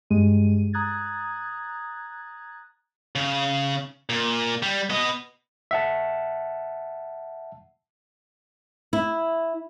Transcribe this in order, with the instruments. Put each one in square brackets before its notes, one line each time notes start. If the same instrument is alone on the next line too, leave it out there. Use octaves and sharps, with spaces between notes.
[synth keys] G2 G#3 G4 D#7
A#5 D#6 F#6 G#6 A6
[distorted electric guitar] C#3
A#2
G3
B3 D#5
[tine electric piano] E5 F#5 A5
[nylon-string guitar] E4